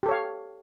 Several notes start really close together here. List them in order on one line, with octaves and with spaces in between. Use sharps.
G4 A4 C#5 F5